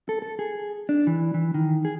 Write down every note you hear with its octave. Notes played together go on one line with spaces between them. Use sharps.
A4
A4
G#4
D4
E3
E3
D#3
G#4